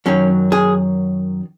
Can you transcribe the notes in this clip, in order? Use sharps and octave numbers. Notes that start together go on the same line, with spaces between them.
F#2 D#3 F#3 C#4
G#4